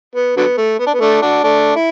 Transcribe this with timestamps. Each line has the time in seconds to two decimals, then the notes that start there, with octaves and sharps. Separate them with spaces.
0.15 B3
0.37 D3 F#3 B3
0.58 A3
0.79 B3
0.86 D4
0.94 B3
1.01 A3 D4
1.22 D4 F#4
1.44 A3 D4
1.76 E4